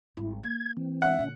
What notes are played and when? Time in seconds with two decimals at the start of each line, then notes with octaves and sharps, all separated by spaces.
0.17 G#1 G3 E4
0.43 A#3 G#6
0.77 E3 C4
1.02 G#3 D#4 E5 F#5
1.19 A#2 D3 C#4